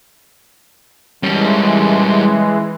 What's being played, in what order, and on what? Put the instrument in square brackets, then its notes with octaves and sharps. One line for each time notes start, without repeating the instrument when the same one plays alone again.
[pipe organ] E3 G#3 [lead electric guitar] G3 C#4